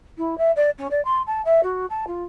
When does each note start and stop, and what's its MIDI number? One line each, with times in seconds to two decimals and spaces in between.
0.17 0.37 64
0.38 0.51 76
0.56 0.70 74
0.78 0.87 61
0.91 1.03 74
1.05 1.22 84
1.26 1.41 81
1.45 1.61 76
1.63 1.86 66
1.90 2.05 81
2.07 2.24 65